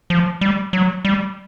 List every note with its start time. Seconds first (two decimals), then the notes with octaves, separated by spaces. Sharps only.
0.10 F3
0.41 G3
0.73 F#3
1.05 G3